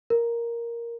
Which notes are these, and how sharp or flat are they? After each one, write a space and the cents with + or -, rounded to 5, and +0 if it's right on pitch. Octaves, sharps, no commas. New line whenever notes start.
A#4 +5